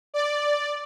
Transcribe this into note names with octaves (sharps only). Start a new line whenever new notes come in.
D5